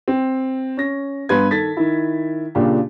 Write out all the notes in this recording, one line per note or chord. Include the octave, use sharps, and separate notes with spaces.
C4
C#4 A#6
G2 B3 B4 C6 G#6
D#3 A4 A6 B6
D#3 E4
A#2 C#3 D4 F4 G4